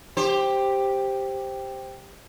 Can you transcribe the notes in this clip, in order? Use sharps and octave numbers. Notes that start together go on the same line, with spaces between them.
G4 C5